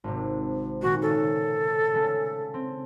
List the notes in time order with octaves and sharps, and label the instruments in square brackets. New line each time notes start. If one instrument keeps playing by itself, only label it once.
[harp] G#1 C3
[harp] A#2 D#3 A#3 [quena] F#4
[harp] C#3 [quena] A4
[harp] C#3 A3
C4